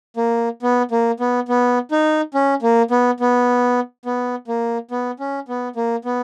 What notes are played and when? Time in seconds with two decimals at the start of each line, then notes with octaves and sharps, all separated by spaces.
0.17 A#3
0.63 B3
0.91 A#3
1.20 B3
1.49 B3
1.91 D#4
2.34 C#4
2.62 A#3
2.91 B3
3.20 B3
4.06 B3
4.48 A#3
4.91 B3
5.20 C#4
5.49 B3
5.76 A#3
6.05 B3